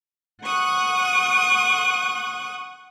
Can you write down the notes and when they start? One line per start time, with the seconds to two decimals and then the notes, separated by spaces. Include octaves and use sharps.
0.43 F#5 C#6 D#6 F#6